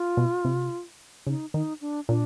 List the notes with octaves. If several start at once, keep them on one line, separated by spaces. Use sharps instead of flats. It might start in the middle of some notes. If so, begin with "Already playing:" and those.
Already playing: F4
B2
C3
C#3 D#4
D#3 D#4
D4
A#2 D4